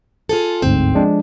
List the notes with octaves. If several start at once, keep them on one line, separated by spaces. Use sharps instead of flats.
F4 G#4 A4
G1 D2 G#2 C4
F3 G#3 D4